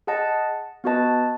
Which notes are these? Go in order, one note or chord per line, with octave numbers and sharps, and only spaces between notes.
G#4 D#5 F#5 A5
B3 F#4 B4 D#5 A5